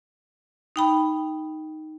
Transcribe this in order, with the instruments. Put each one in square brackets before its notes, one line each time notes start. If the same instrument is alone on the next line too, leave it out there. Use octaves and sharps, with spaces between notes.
[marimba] D#4 G5 B5